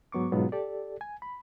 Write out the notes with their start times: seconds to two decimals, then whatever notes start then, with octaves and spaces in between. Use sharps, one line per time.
0.12 G#2 F#3 B3 C#6 D6
0.32 G#2 B2 F#3 B3 F4
0.52 G4 A4 D5
1.01 G#5
1.22 B5